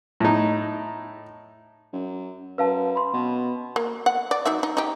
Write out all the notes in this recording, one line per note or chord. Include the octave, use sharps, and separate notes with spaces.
A2 D#4
F#2
F#2 B4 F5 A5
B5 C6
B2
A#3
F#5
D5
F#3 D#4 E5
D#4
D#4 G4